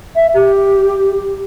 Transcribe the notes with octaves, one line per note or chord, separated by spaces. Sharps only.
E5
G4